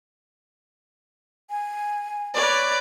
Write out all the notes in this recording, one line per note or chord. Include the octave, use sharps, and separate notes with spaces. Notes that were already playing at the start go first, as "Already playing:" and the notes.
G#5
B4 C#5 D5